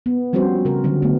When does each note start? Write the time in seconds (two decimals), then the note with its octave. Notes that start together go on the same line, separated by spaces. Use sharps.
0.06 B3
0.33 F3 G3 C4 C#4 F#4 C5
0.65 C#3 A#4
0.84 D3 F#3 C4
1.02 D3 A3 B3